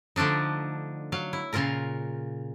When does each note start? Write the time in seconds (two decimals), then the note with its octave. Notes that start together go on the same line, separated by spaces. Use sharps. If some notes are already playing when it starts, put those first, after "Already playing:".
0.16 D3 F3 A3 D4 D#4
1.12 F#3 F5
1.33 E4
1.53 A#2 C#3 F4 A#4 A#5